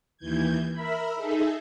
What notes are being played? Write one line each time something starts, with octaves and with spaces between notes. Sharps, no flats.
D#2 E3 G6 G#6
A#4 E5 B5
D#4 G#4 A4 E5